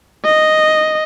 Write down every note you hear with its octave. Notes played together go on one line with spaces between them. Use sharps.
D#5